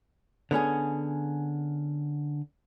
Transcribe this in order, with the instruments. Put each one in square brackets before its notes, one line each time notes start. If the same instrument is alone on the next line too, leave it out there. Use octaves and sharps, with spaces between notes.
[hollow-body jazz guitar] D3 B3 C#4 G#4